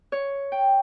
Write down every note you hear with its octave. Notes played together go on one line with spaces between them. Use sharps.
C#5
G5